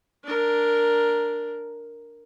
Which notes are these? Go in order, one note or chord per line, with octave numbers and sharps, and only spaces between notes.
D4 A#4